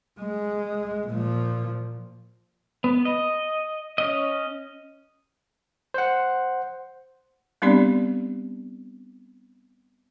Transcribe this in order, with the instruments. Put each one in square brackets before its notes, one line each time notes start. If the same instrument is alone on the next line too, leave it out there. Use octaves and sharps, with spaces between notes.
[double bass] G#3
A#2 F3
[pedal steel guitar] B3
D#5
C#4 D#5
[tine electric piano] C5 F#5
[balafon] G3 B3 C4 D4 G4 D5